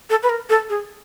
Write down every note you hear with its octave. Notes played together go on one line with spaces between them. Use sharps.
A4
B4
A#4
A4
G#4